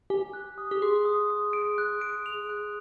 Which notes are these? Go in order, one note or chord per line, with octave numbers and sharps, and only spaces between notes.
G4 G#5
F#6
D#6
G4
G#4 C6
D#6
D#6
D7
F#6
D7
F7
F#6